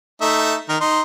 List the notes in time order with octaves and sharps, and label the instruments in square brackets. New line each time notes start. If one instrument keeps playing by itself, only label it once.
[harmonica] A3 D#4 E5
D#3 A#4
D#4 C6